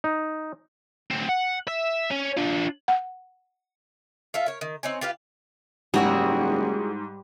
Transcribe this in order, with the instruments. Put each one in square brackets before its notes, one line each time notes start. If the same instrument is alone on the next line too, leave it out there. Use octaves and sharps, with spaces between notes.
[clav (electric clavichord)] D#4
[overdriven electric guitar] D2 C4
F#5
E5
C#4
D4 F4
[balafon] F#5
[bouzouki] F4 A4 E5 F5
A#4 C#5
D#3
C4 D#4 C#5 G#5
F4 G4 B4 F5
[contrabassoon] F#1 [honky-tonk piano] G#2 [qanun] G3 [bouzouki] E4 F#4 G#4